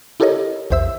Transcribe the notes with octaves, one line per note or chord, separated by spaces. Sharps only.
E4 G4 A4 A#4 C#5 D#5
A#1 E2 C5 E5 E6